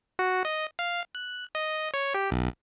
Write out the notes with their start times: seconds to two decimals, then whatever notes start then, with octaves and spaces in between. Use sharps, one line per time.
0.19 F#4
0.45 D#5
0.79 F5
1.15 F#6
1.55 D#5
1.94 C#5
2.14 G4
2.31 B1